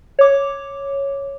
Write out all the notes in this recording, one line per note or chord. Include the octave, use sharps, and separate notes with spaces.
C#5 D6